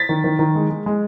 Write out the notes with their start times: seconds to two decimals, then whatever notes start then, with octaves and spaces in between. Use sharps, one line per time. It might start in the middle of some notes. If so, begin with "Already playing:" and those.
Already playing: A6 B6
0.09 D#3
0.24 D#3
0.39 D#3
0.55 G#3
0.70 G#3
0.86 G#3